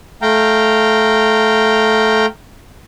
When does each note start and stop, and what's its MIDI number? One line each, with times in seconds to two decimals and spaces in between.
0.22 2.26 57
0.22 2.26 77
0.22 2.26 79
0.22 2.26 82